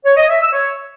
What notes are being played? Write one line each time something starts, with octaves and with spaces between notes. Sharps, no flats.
C#5
D#5
E5
E6
C#5